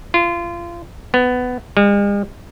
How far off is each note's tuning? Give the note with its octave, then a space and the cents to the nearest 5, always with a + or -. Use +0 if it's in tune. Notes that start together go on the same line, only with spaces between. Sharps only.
F4 -25
B3 +15
G#3 -45